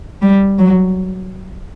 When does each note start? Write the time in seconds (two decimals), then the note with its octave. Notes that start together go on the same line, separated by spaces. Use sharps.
0.22 G3
0.59 F#3